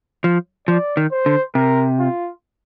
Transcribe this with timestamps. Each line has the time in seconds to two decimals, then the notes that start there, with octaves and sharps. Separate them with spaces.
0.24 F3
0.68 F3 D5
0.97 D#3
1.12 C5
1.26 D3
1.55 C3 A#4
1.99 F4